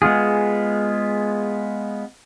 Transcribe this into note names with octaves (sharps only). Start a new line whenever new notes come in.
G#3 B3 F4 G#4